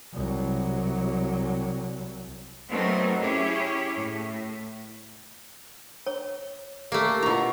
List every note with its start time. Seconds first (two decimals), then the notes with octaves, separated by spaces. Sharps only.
0.13 C2 F#3
2.70 F#3 A3 B3 C4 D#4 A#4
3.22 C#4 E4 G4 G#4 C#5
3.95 A2
6.06 C#5
6.92 A3 A#3 G4
7.23 B2 E4 F4 A#5 C#6